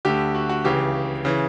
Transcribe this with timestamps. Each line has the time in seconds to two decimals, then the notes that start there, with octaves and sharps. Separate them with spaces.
0.05 D2 D3 G4
0.35 F#4
0.49 F#4
0.64 C#2 C#3 E3 G4
1.25 C#3 E3